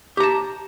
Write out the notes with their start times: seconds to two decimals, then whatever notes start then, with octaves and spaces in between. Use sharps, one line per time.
0.17 G4
0.20 A#5
0.23 A5